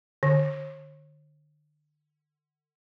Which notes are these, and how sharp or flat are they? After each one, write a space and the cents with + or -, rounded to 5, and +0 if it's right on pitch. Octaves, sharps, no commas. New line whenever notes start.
D3 +35